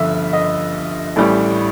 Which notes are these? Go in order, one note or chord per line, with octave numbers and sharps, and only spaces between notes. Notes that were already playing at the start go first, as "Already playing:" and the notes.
Already playing: G1 G2 D3 F3 E5
D#5
A1 A2 E3 G3